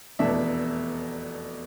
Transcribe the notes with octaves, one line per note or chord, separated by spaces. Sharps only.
F1 E2 B2 A3 D4 E5